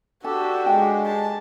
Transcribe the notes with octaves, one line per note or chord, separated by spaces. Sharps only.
D4 F#4 G4 A4 A5
G#3 G5
A5